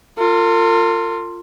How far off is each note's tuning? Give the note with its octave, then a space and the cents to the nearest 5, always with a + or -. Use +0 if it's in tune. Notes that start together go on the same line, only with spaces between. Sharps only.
F4 +0 A#4 -45